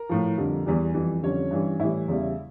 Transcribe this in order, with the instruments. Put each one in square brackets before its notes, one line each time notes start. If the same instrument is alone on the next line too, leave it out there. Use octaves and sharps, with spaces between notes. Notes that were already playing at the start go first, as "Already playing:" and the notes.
Already playing: [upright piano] A#4
A2 F3
F2 D3 G3
E2 E3 G3
F2 E3 G3
F2 D3 G3 C#4 C#5
G2 E3 G3
A2 E3 G3 E4 E5
E2 C#3 G3